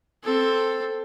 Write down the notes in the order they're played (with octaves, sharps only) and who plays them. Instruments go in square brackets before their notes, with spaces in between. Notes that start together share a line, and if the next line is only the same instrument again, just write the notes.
[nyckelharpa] C4 A4